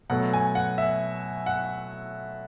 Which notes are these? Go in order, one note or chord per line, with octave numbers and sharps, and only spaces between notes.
B2 F#3 A3 F#5
G#5
F#5
E5
F#5